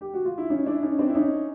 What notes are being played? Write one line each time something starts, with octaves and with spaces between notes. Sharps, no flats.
G4
F#4
F4
E4
C#4 D#4
D4 E4
C#4 D#4
C4 D4
E4
C#4 D#4